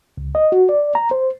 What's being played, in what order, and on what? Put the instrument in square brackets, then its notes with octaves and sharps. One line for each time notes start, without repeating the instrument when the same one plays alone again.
[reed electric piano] C#2
D#5
F#4
D5
A#5
C5